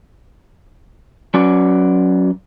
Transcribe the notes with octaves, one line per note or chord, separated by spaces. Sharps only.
F#3 C#4 F#4 B4 D5